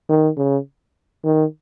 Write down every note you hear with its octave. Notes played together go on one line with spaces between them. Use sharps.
D#3
C#3
D#3